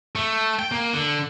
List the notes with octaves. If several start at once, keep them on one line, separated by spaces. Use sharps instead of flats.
A3
G5
A#3
D3